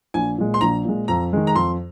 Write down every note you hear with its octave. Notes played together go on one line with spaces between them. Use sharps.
A#1 G#5
A#2 G#3
C6
A#1 A#5
A#2 G#3
F2 A#5
D#3 G#3
A#5
F2 C6